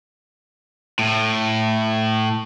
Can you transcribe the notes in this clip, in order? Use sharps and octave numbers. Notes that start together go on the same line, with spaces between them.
A2